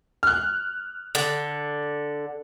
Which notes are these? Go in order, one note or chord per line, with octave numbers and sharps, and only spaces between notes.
F6 F#6
D3